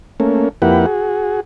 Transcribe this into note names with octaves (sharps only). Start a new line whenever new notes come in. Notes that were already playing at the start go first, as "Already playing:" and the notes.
A3 A#3 C#4
F2 A#3 E4 G4 B4 F#5
F#4 G#4